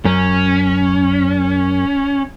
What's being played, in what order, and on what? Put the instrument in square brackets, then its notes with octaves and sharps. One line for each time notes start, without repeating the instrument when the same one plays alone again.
[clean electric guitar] F#2 [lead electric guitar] C#4